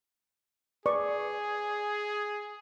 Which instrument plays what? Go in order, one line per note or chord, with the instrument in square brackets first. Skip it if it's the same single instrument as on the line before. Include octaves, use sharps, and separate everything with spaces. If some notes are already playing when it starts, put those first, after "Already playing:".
[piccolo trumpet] G#4 [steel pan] B4 D5 C#6